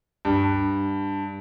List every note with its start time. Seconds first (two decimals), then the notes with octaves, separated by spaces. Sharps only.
0.25 G2